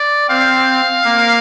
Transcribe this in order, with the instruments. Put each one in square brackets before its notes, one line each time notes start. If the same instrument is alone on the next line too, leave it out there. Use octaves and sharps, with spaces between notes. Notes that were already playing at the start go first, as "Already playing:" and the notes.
Already playing: [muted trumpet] D5
[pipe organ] C4 [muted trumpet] F5
[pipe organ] A#3